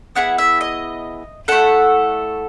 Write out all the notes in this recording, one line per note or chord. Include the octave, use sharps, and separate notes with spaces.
B3 E4 G#4 F#5
E5
D#5
A3 E4 A4 F#5